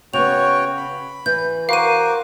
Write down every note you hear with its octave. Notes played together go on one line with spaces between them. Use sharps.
C#3 B3 F#4 C#5 G5 F7
B5
E3 G6
F#4 A#4 C5 F5 D6 D#7